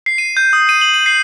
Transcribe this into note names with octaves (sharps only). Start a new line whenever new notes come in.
C7
D#7
G6
D#6
D#7
F#7
D#7
C7